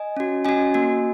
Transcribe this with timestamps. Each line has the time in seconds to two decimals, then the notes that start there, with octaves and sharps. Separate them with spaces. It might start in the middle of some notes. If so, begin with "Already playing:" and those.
Already playing: D#5 G#5
0.17 C#4 F#4
0.45 C#4 F#4 D#5 G#5
0.74 A#3 F#4